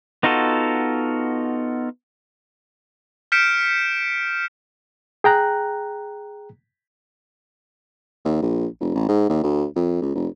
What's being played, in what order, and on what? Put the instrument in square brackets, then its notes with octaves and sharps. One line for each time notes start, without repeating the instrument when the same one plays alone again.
[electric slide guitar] B3 D#4 F4 F#4 A4
[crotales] F6 G6 B6 C#7 D7 E7
[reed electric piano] G#4 G5 A#5 F#6
[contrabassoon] D#2
A#1
F1
A1
G#2
D#2
D2
F2
C#2
F1